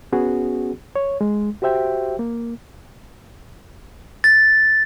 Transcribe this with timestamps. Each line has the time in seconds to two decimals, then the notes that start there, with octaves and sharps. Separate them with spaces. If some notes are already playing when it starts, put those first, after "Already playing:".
0.12 B3 C#4 F#4 G#4
0.96 C#5
1.21 G#3
1.62 F#4 G4 C5 E5 G5
2.19 A#3
4.24 A6